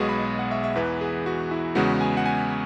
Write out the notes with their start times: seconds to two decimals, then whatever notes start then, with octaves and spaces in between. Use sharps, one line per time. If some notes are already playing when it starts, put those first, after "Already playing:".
Already playing: B1 B2 G#3 B3 F#4 G#4
0.09 B5
0.39 F#5
0.51 E5
0.64 E5
0.75 E2 E3 B3 B4
1.01 G#4
1.26 F#4
1.51 E4
1.75 E2 C#3 G#3 B3 F#4
2.01 G#5
2.17 F#5
2.26 G#5